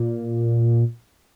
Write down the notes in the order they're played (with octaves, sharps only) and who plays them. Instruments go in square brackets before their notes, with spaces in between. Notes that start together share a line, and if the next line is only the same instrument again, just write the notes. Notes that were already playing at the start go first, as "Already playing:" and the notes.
Already playing: [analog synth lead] A#2